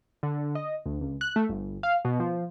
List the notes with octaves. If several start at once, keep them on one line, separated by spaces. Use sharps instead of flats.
D3
D#5
D2
C#2
F#6
A3
G1
F5
B2
F3